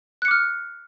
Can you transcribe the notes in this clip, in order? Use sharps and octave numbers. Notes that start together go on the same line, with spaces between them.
D6 F6 F#6 C#7